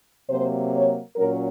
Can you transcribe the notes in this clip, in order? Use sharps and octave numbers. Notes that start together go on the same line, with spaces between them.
C3 F#3 A#3 C5
C#5
A#2 F#3 C#4 A#4